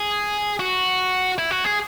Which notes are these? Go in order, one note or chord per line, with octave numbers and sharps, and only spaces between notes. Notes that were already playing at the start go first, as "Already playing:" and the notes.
Already playing: G#4
F#4
E4
F#4
G#4